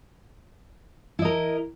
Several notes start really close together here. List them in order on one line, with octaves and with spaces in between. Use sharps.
E4 D#5 A#4